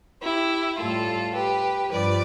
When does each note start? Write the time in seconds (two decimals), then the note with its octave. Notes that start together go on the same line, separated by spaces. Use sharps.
0.22 E4 G4
0.78 A2 G3 F4 A4
1.35 G4 B4
1.90 G2 F3 B4 D5